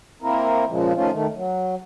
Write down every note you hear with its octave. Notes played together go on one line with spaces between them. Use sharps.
A#3 C4 E4 A#4
A#2 C#3 F3 G#3
D#3 F3 A3 C#4 F4
D#3 A3
F#3